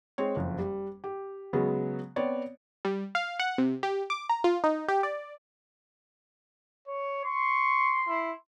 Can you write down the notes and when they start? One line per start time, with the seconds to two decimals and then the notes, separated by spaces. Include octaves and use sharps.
0.18 G#3 C4 C#5
0.36 F#1 F2
0.58 G3
1.04 G4
1.53 C#3 F#3 G#3 B3
2.16 B3 C4 C#5 D5
2.85 G3
3.15 F5
3.39 F#5
3.58 C3
3.83 G4
4.10 D6
4.29 A#5
4.44 F4
4.64 D#4
4.88 G4
5.03 D5
6.88 C#5
7.24 C6 C#6
8.08 E4